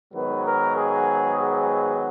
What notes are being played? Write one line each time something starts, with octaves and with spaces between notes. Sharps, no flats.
G#2 D#3 F#3 B3 B4
A#4
G#4
G#4